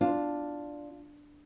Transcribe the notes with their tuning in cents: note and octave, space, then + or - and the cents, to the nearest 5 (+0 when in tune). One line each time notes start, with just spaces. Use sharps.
D4 +0 F4 +0